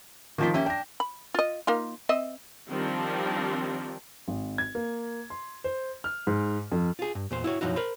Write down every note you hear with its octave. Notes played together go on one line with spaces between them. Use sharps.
D#3 F3 A#3 C4 F4 B6
A#3 C#4 G4 E5
D4 G5 A#6
B5
F4 D#5
A#3 D#4 F4
C4 D#5 E5
D#3 F3 G3 C4 D4
G#1
G#6
A#3
C6
C5
F6
G#2
F2
F4 G#4
G2
E2 A#2 C5
E4 F#4 C#5
B1 F#2 F3 D#4 E4 F#4
A#4 C5 B5